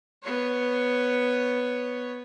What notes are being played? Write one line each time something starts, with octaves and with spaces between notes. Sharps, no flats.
B3 C#5